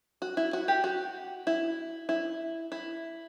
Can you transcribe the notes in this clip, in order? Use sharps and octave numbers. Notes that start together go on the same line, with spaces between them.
F#4
E4
F#4
G4
F#4
E4
E4
E4